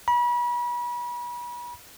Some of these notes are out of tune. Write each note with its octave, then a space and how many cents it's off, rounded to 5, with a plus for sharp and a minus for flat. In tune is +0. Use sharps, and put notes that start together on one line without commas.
B5 -35